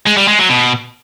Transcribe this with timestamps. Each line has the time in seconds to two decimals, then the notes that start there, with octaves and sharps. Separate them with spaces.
0.06 G#3
0.17 G3
0.28 G#3
0.39 F#3
0.50 B2